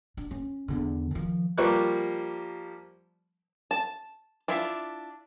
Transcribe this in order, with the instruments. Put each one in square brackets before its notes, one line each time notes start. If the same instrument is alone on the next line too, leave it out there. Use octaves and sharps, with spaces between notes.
[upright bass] D4
C#4
E2 D3
D#3 F3
[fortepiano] F3 G3 A#3 C#6 D6 F#6
[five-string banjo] A5
D4 E4 F4 E5